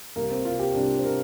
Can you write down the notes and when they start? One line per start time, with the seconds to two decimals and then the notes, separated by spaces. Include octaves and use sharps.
0.16 C2 C3 A#3
0.31 C4
0.45 C2 C3 F4
0.59 G4
0.74 C2 C3 D4
0.99 C5
1.04 C3 A#4